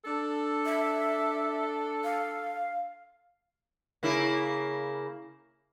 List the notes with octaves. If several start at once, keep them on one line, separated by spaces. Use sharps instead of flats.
D4 A4
E5
F5
C#3 A#3 E4